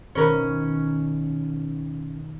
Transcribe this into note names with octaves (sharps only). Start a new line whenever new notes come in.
B2 D#3 C#4 A#4 B4